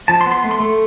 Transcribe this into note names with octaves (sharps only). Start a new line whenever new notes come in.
F3 A5
C6
B3
C6
A3
C6
A3